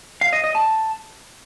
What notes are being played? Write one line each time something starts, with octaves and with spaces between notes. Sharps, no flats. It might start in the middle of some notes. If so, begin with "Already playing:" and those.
F5
D#5
D#5
A5